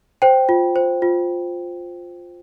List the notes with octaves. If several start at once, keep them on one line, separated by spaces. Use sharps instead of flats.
C5 G5
F4
C5
F4